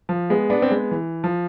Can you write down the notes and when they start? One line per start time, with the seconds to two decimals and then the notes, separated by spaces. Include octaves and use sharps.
0.09 F3
0.30 G#3 B3
0.50 B3 D4
0.62 C4
0.71 G#3 B3
0.91 E3
1.24 F3